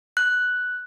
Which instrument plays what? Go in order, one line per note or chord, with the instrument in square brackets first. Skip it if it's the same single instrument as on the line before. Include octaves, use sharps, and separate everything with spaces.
[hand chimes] F#6